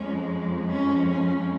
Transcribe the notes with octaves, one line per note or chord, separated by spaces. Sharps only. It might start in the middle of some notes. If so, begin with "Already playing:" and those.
Already playing: F2 F3 G#3 C#4
C#4
C#4